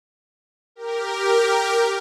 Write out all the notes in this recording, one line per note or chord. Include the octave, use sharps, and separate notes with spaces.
G4 A#4